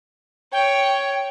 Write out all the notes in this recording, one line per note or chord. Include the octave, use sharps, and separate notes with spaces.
C#5 G5